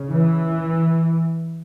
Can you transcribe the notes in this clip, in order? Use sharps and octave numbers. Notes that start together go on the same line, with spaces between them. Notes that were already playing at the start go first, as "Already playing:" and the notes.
Already playing: C#3
E3